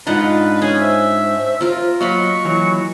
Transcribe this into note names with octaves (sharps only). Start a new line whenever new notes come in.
G#2 D4 D#4 F4 B4 F#5
C#4 G#4
C5 E5
F4 A#4
F#3 A#3 D#5 F5 B5 C#6
E3 F#3